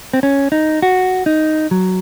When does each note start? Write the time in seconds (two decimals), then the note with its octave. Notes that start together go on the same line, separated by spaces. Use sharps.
0.14 C4
0.23 C#4
0.52 D#4
0.82 F#4
1.26 D#4
1.71 F#3